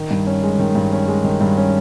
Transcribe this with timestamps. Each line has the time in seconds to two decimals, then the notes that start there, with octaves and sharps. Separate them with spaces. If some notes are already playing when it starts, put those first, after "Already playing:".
Already playing: D#3
0.11 G2
0.27 C#4
0.43 G#3
0.59 D#3
0.75 G2
0.92 C#4
1.08 G#3
1.24 D#3
1.41 G2
1.57 C#4